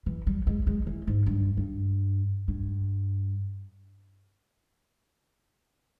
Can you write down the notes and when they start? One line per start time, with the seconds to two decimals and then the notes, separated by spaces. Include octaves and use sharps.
0.06 E3
0.27 G3
0.47 G#3
0.67 G#3
0.87 E3
1.07 G#2
1.26 G2
1.57 G2
2.48 G2